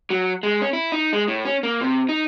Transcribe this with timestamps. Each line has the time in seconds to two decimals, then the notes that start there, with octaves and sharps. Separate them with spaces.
0.10 F#3
0.43 G#3
0.61 C#4
0.73 E4
0.92 D#4
1.13 G#3
1.28 A2
1.45 C#4
1.63 A#3
1.81 C3
2.09 D#4